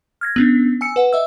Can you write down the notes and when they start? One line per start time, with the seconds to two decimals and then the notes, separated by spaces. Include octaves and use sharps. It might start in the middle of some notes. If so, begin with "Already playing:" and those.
0.21 F6 G#6 A#6
0.36 B3 C#4 D4
0.81 G#5 E6 C#7
0.96 B4 F#5
1.13 D#5 E5 E6